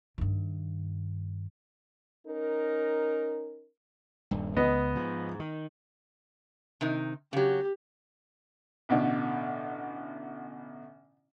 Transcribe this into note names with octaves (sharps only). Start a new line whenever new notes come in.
G2 D#3
C#4 D#4 A#4
D#1 G2
C#2 B3 D#5
G#2 F3
D#3
C3 D#3 D#4
C#3 F#3 G4
A1 B2 D3